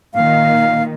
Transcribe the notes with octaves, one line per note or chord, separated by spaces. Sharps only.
A#2 D#3 F5